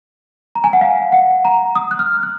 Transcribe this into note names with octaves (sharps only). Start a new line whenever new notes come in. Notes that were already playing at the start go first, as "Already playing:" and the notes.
A#5
G#5
F#5
F5
F#5
A#5
D#6
F#6
F6
F#6